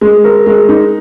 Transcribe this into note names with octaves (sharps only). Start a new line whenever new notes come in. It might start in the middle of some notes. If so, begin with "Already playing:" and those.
G#3
A#4
G#3
D#4